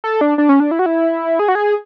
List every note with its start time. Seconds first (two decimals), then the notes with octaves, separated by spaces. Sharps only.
0.04 A4
0.21 D4
0.38 D4
0.49 C#4
0.60 D4
0.71 E4
0.79 F#4
0.86 E4
1.39 G#4
1.48 F#4
1.55 G#4